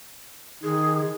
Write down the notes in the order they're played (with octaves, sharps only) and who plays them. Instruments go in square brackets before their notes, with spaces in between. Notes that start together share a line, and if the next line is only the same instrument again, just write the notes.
[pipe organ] D#3 [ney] G#4